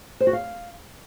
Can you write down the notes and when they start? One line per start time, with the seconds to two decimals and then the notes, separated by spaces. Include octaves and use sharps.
0.20 C5
0.27 F#4
0.33 F5